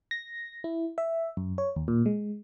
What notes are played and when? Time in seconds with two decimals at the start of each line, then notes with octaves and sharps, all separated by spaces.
0.11 A#6
0.64 E4
0.98 E5
1.37 F#2
1.58 C#5
1.76 D#2
1.88 A#2
2.06 G#3